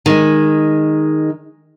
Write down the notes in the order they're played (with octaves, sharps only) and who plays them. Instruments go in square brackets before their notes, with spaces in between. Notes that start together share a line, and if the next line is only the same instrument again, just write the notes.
[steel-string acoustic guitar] D#3 G#3